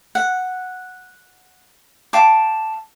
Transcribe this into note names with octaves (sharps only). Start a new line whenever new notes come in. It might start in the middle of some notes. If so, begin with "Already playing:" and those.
F#5
F5 G5 A5 D6